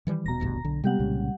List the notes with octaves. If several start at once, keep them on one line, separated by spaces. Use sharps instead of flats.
D#3 E3 G3
D#1 B2 A#5 A#6
A1 D2 G2
B1 D3
C3 G3 G#3 B3 G4 F#5
C2 A#2 C#3